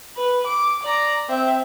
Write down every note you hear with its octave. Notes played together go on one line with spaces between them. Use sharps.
B4
D6
D5 A#5
C4 E5